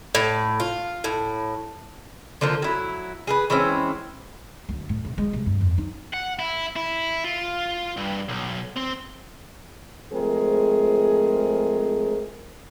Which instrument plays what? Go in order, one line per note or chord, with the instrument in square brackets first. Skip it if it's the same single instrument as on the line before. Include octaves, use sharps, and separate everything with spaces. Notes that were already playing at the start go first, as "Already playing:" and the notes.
[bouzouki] A2
F4
A2
D3 F3 A#3 F4
F#3 E4
G#4 A#4 B4
E3 G#3 C4 C#4
[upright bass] D2
A2
C3
G#3
C3
G2
F2
D#4
[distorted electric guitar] F#5
E4
E4
F4
G2
B1
C4
[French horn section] F3 G#3 A3 C4 G#4 A#4